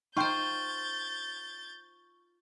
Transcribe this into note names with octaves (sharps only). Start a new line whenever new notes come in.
D#4 F4 C5 G5 C6 C#6 G6 A6